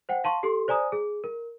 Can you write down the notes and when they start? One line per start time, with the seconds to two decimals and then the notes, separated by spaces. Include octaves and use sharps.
0.09 C5 F#5 G5
0.24 F5 A5 C6 C#6
0.43 G4 A4 C6
0.68 C5 D5 G#5 A#5 D#6
0.92 G#4
1.24 A#4